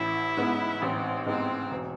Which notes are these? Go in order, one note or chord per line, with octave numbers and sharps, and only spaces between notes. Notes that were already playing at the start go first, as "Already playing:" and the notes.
Already playing: A1 E4
G#2 G#3 B3
A1 C4
G#2 G#3 B3 C4
E1